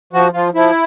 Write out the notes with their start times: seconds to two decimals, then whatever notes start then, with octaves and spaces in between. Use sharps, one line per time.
0.13 F3 F#4
0.34 F3 F4
0.54 F3 E4